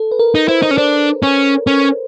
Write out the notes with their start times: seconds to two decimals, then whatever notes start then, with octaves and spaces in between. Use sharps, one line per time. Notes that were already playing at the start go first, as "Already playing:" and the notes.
Already playing: A4
0.12 B4
0.19 A#4
0.35 D#4
0.48 E4 C5
0.62 D#4
0.71 C#4
0.78 D4 C5
1.23 C#4
1.67 C#4